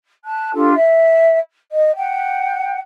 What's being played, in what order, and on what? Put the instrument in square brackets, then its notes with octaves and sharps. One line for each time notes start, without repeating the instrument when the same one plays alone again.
[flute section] A5 F#6
D4 F4 G4 A4
E5
D#5
F#5 G5